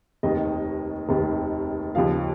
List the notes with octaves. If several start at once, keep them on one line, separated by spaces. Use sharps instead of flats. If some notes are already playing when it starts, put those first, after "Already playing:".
F1 D#2 D#3 D#5
F1 D#2 D#3
D#2 C#3 F3 F5